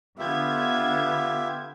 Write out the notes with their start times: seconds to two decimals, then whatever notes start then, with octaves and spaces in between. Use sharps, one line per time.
0.19 D3 B3 F4 G4 E5 G#6